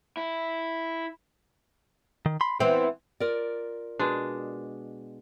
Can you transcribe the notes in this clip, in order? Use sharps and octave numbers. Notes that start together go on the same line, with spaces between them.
E4
D#3
B5 C6
E3 B3 C4 C5 G5
F4 A#4 D5
B2 G#3 D4